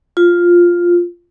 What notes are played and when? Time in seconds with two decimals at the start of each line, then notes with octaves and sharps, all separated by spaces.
0.17 F4